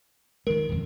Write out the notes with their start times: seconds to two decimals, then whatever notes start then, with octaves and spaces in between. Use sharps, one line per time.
0.47 D#3 G#3 A#4
0.69 D#1 F2